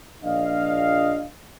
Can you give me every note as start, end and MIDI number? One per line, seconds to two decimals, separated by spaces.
0.24 1.26 34
0.24 1.26 62
0.24 1.26 75
0.24 1.26 77